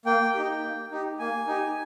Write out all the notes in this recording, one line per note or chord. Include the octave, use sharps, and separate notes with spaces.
A#3 G5
D#4 G4
A#3
D#4 G4
A#3 G#5
D#4 G4